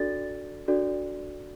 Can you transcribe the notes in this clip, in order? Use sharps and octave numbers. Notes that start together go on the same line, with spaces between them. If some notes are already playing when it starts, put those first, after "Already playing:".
Already playing: D4 F#4 A4 D5 A6
D4 F#4 A4 D5